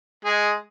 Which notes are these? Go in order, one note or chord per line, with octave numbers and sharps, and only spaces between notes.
G#3 G#4